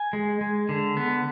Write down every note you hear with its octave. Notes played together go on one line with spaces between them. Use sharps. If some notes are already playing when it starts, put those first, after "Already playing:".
Already playing: G#5
G#3
G#3
D3
B3